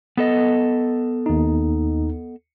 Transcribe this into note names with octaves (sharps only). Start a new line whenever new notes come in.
B3 A4 D#5
D#2 D#4